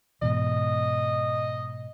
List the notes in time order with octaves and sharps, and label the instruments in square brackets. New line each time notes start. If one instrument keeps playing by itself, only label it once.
[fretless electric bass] G#2 B2 E3 [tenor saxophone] D#5